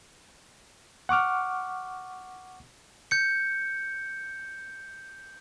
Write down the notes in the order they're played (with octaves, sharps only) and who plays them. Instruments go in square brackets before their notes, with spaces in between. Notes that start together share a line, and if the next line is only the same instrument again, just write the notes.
[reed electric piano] F#5 C#6 D6 F6
[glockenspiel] G6 C#7